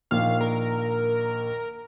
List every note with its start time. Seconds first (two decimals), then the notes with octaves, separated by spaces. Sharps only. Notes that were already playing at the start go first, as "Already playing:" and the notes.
0.11 A#1 D#3 F5 F6
0.41 A#4